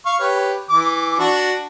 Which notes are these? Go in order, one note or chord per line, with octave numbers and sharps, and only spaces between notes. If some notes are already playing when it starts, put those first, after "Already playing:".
F5 C#6
G4 B4 C#5
E3 D6
D4 F#4